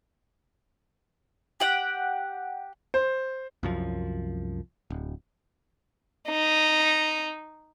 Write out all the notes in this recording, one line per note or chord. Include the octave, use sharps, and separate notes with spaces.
G4 F#5 G5
C5
C2 F#2 F3
D1
D#4